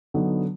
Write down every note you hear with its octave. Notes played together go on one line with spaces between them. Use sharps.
D3 F#3 B3 D#4